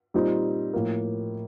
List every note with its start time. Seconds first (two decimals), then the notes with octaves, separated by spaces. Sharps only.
0.14 A#2 G3 C4 D#4
0.73 A2 F3 A#3